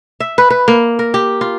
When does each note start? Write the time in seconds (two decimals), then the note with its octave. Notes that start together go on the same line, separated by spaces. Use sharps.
0.20 E5
0.38 B4
0.50 B4
0.68 A#3
0.99 A#4
1.14 G4
1.41 F4